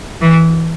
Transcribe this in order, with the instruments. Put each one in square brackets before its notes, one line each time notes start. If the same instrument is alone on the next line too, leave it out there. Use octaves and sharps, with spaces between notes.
[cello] E3